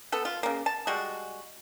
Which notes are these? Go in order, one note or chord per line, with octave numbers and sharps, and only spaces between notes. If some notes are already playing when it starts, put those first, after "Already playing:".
B3 A4
F4
C#3 A#3
A5
G3 G#3 F#4